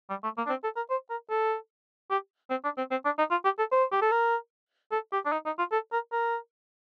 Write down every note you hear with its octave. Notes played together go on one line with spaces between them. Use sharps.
G3
A3
A#3
D4
C4
A4
A#4
C5
A#4
A4
G4
C4
D4
C4
C4
D4
D#4
F4
G4
A4
C5
G4
A4
A#4
A4
G4
D4
D#4
D#4
F4
A4
A#4
A#4